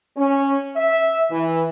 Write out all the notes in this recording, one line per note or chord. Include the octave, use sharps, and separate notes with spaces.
C#4
E5
E3